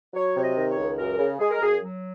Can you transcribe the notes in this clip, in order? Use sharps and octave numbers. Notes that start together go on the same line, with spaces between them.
F#3 C#5
C3 C#5
D#5
D#3
C#5
C#2
F#2 A#4
C#3
G#3 G#4
A#4
F#2 G#4
F#3